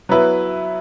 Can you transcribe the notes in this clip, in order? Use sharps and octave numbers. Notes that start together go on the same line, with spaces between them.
F#3 B3 E4 B4